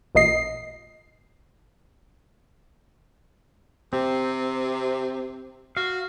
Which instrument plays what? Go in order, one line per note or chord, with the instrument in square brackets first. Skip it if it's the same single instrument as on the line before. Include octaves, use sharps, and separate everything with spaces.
[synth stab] A1 A#2 D#5 C7
[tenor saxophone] C3 [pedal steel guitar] C4
[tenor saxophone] F#4 [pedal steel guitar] F5